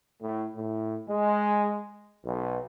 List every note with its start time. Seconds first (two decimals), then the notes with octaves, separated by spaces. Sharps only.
0.21 A2
0.56 A2
1.09 G#3
2.25 B1